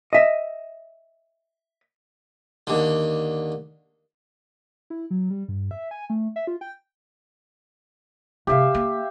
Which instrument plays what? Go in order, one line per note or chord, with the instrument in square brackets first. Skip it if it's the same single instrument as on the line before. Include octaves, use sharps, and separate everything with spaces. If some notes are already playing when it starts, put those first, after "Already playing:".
[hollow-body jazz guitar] D#5 E5
[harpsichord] D#2 D3
[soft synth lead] E4
F#3
G3
G2
E5
G#5
A3
E5
F4
G5
[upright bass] G#2 C3 [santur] G4 E5 F5
[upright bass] A#3